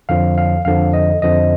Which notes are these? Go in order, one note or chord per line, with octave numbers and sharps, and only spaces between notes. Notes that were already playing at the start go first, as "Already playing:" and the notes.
F2 D3 F3 F5
F5
F2 D3 F3 F5
D#5
F2 D3 F3 D#5